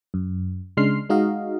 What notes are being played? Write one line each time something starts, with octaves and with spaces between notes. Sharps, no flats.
F#2
C#3 G#3 D4 C6 F6 C7
G#3 D#4 F#4 D#5 F5